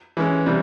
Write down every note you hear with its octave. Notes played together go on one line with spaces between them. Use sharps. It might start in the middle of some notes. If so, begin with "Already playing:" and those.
E3 G#3 C#4
C3 E3 G3